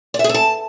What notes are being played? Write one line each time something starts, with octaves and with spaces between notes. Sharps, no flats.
D5
E5
G#4
A4
A5